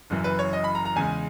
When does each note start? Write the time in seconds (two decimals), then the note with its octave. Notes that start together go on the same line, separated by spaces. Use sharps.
0.10 F#1 F#2 E3
0.24 B4
0.39 C#5
0.53 D#5
0.64 B5
0.75 A#5
0.85 A#5
0.96 E2 C#3 G#3 G#5